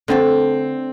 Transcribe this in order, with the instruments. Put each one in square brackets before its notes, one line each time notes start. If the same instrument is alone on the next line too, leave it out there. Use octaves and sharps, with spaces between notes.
[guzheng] D3 A3 D4 A4 [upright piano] C4